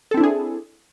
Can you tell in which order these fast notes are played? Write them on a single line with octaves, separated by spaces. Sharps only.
A4 C4 E4 D4 G#4